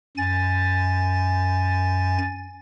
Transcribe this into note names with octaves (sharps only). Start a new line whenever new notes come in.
F#2 G#5 A6